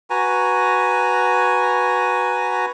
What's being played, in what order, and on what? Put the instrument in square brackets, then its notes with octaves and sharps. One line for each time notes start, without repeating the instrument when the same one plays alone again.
[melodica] F#4 B4 G#5 A#5